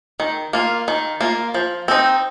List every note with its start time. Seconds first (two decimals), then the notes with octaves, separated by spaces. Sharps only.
0.20 D#3
0.53 A#3 F4
0.88 D#3
1.21 A#3 F4
1.54 F3
1.88 C4 D#4